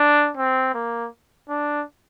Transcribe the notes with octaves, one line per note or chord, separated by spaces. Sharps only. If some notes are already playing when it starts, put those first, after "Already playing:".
Already playing: D4
C4
A#3
D4